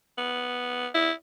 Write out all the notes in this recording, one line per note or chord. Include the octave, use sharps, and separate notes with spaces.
B3
E4